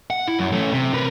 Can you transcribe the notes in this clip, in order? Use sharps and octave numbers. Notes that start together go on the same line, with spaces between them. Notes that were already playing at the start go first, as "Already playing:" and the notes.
F#5
E4
F#2
A3 C#4
C3
A#4 B4